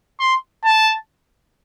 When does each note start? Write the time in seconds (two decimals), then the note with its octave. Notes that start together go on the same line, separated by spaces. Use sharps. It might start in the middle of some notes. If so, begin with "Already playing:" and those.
0.20 C6
0.66 A5